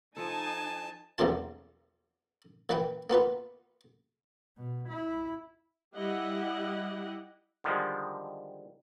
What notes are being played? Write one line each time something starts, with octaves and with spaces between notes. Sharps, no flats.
F3 D#4 A4 G#5 A5
B1 E2 C#3 A#3 F4 A5
A#2 E3 B4 F#5 G5
A#3 B3 F4 B4
B2
E4
G3 E4 G4 D#5 F#5
D3 D#3 F3 G3 G#3